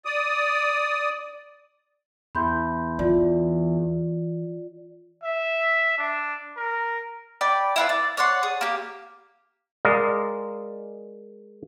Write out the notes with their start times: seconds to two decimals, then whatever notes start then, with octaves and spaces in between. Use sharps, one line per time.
0.05 D5 D#6
2.35 E2 B5 C6 G6
2.99 E3 F4 D5
5.24 E5
5.98 D4
6.57 A#4
7.41 D5 G5 B5
7.76 E4 F4 B4
7.89 D5
8.17 C#5 D5 F#5 C6
8.43 G#4
8.61 A#3 G4
9.85 G#3 A#4 D5 D#5 F5